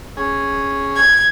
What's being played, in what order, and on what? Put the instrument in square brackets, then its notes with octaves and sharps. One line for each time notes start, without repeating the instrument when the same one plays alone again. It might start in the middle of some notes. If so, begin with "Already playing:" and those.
[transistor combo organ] C#4 G#4
[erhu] G#6